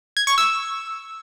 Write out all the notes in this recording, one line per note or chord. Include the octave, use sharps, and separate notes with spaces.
G#6
C#6
E6